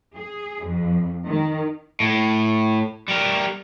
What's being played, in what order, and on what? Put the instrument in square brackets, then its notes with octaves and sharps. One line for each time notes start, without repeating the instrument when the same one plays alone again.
[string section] G#4
F2
D#3
[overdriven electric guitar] A2
G3 A#4